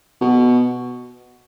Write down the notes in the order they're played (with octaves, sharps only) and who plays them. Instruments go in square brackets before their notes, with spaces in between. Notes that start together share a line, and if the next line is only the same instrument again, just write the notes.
[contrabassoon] B2